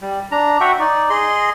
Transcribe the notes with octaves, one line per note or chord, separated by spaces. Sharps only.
G3
D4 A#5
F#4 E5 F#5 G5
D#4 D5
G#4 D#5 C6